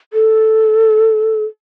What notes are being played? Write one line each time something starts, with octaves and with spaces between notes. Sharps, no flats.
A4